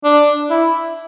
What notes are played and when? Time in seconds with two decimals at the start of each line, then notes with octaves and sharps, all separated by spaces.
0.04 D4
0.50 E4